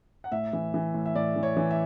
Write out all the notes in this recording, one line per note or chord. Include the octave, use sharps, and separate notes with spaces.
F#5
A2 E5
E3
E3
A2
E5
A2 D5
E3
C#5
E3
E5